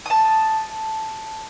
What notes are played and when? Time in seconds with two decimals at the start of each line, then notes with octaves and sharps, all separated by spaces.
0.06 A5 D#6